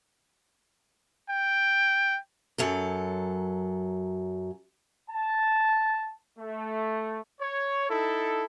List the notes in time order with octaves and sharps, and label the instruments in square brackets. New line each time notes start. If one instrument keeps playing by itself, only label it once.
[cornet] G5
[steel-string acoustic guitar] F#2 F#3 A4
[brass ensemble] A5
A3
[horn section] C#5
D#4 E4 A4